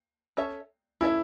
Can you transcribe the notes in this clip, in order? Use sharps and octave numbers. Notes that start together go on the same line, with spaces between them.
C#4 A4 C#5 E5
C#4 E4 A4 C#5 E5